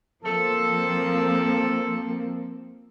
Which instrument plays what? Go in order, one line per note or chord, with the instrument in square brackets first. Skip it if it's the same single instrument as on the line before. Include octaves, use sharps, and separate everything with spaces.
[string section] F3 A#3 C4 [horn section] A4